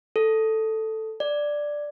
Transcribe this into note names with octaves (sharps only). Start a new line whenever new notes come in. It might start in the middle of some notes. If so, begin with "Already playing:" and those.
A4
D5